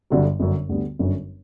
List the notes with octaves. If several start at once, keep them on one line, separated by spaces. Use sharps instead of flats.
G1 G2 D3 F#3
G1 F#2 D3
D2 D3 G3 B3
G1 F#2 D3 F#3 C#4